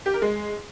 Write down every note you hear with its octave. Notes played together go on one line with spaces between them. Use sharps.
G4
A#4
G#3